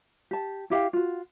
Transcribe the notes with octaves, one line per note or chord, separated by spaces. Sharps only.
G4 A5
E4 G4 F5 G5
F4 F#4